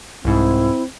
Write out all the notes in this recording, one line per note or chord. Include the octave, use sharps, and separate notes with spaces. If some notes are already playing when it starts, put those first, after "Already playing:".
C2 G#2 C4 E4